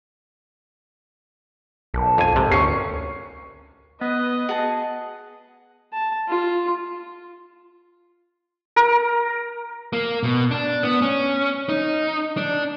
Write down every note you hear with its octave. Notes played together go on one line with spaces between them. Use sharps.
B1 A4 A#4
F2 G#5
G#2 C3
D2 C#4 C#6 C7
B3 B4 D#5
F#4 G#4 A5
A5
F4
A#4
A#3
B2
D4
B3
C#4
D#4
D4